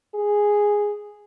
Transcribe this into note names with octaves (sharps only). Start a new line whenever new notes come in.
G#4